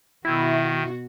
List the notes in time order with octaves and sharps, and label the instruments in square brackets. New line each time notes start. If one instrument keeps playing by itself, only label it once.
[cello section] B2 F#4 [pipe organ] D#3 [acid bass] E4